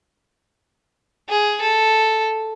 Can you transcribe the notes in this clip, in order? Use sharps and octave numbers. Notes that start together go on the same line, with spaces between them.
G#4
A4